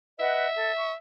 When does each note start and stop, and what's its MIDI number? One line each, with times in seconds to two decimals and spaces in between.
0.19 0.48 71
0.19 0.48 75
0.19 0.94 76
0.19 0.48 78
0.56 0.71 69
0.78 0.92 85